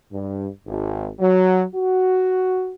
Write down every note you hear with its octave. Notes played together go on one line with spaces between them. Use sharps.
G2
G#1
F#3
F#4